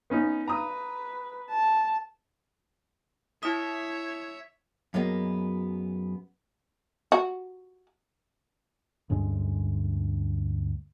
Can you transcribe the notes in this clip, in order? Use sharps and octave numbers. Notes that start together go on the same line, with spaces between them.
B3 C#4 D#4
B4 A#5 D#6
A5
E4 C#5 E5 D#6
F#2 F#3 G#3 A#3 B3
F#4
D2 G2 G#3 C#4